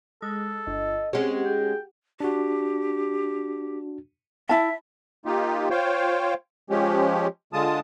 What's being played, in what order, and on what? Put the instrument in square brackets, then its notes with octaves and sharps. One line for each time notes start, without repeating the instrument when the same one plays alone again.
[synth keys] G#3 [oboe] A4
[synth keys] G1 [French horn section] D#5
[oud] G#3 C#4 [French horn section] C4 [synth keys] G4 F#5
[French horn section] D#4 F#4 G#4 [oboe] G5
[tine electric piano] D4 F#4 [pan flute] G4
[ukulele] E4 A5 [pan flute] E5
[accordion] A#3 D#4 F4 G4
F4 C5 C#5 F5 G5
F3 G#3 C#4 G4
D3 G#3 F4 A5 D#6